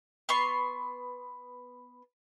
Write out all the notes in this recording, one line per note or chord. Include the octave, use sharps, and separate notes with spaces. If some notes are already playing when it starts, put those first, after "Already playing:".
B3 C6 C#6